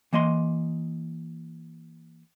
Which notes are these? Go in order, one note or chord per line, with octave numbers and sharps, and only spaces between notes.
E3 A#3 D#5 C6